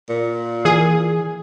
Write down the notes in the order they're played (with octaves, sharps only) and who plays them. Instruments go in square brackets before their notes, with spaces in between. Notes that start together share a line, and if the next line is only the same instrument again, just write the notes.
[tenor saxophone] A#2
[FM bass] E3 [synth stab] G#4